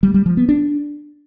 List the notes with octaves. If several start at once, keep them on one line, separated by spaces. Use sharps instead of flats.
G3
G3
F3
B3
D4